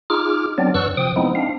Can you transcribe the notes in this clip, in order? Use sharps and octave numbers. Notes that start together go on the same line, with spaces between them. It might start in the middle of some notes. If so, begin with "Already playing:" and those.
D#4 F4 G#4 D6 F6
F#3 B3 C4 D4 D5
F#2 E3 C#6 E6 F#6
C3 F3 G5 D#6
F3 G#3 B3 C4 D#4 E4
C4 D4 F5